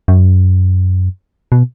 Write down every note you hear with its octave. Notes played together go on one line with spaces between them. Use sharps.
F#2
B2